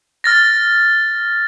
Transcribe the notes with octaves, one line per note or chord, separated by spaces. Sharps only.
F6 A6 A#6